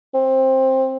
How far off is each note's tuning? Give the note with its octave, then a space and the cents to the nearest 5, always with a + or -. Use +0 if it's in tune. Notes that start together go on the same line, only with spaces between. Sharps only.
C4 +15